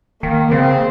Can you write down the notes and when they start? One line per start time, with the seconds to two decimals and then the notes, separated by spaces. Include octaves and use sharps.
0.22 D#3 A#3
0.52 C#3 C4